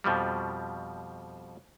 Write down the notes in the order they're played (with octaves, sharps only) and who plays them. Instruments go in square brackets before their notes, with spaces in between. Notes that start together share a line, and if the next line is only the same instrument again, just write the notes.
[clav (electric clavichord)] F2 B2 F3 G3